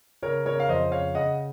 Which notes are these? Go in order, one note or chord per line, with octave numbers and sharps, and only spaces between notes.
C#3 A#4 C#5
C#3 A#4 C#5
F5
F2 C5 D#5
C#3 C#5 F5
C#3 D#5 F#5